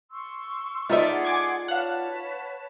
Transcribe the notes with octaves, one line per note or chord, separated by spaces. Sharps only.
C6 C#6 E6
A3 D#4 F4 D5 E5
G#4 F#5 C6
G#5 D6 G#6
B4 C#5 F5 F#5 A5